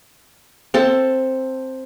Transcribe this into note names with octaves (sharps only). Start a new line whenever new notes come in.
C4 A4